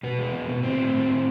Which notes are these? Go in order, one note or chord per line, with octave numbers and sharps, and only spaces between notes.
B2 B3
G#3
B2
B2
A2 C4
A2
A2
A2